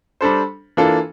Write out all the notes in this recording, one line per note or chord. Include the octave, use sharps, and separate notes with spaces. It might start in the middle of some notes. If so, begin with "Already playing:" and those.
G3 D4 A4 C5
E3 A#3 D4 F4 A4